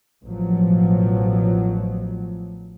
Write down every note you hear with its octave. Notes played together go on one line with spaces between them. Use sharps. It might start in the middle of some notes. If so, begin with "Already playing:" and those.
A1 B2 F3 F#3